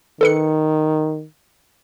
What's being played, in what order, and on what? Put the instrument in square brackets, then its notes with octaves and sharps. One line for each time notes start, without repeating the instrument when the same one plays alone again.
[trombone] D#3 [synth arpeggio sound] A4 B4 C#7